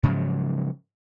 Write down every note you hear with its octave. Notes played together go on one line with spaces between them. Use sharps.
G#2 C#3 F3 F#3